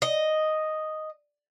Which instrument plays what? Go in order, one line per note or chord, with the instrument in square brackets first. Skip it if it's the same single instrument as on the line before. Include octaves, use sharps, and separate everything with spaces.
[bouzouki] D#5